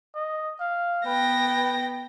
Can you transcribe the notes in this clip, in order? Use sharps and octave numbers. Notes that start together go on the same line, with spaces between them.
D#5
F5
B3 B4 G5 A#6